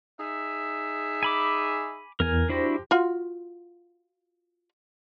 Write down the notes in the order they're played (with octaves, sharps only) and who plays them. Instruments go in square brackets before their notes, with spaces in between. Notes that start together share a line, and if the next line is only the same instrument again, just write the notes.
[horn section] D#4 G#4 E5
[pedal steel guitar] G#5 B5 D6
[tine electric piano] E2 [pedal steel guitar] A#4 G#5
[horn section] F3 G4 [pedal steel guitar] D4 E4 F#4 [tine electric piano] C5 A#6
[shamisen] F4 F#4